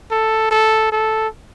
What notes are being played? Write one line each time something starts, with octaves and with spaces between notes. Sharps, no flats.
A4
A4
A4